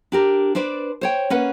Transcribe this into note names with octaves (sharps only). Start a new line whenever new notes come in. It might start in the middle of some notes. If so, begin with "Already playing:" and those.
D4 G4 A#4
D4 B4 C5 D5
C5 C#5 G5
A#3 C#4 B4 F#5